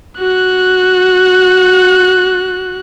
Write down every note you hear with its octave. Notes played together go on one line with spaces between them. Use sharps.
F#4 F#6